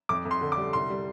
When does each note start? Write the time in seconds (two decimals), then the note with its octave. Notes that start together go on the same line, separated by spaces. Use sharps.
0.09 F2 D6
0.25 F2
0.31 C6
0.41 D3
0.52 D6
0.57 G3
0.73 C2 C6
0.90 G3